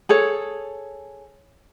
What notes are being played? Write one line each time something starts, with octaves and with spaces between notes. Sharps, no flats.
G#4 A4 C#5